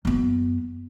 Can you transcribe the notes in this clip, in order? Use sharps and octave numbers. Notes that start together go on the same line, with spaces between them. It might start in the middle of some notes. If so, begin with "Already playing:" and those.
F#2 B3